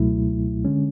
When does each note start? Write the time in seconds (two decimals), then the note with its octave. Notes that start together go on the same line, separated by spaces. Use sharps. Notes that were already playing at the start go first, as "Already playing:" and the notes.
Already playing: C#2 B2 F#3 A3 E4
0.65 D3 G#3 C#4